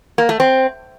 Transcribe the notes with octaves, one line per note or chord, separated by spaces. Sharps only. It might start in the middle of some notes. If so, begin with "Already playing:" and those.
A#3
A3
C4